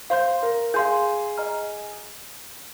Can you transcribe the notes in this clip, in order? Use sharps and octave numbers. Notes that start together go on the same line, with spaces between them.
C5 F5 C6 G6
A#4
G#4 F5 C6 G6
D#5 A#5 F6